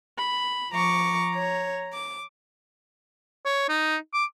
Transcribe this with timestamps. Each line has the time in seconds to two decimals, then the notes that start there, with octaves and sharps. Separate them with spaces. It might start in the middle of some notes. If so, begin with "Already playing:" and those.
0.18 B5
0.73 F3 A#5 C#6 D6
1.35 C#5
1.93 D6
3.45 C#5
3.69 D#4
4.13 D6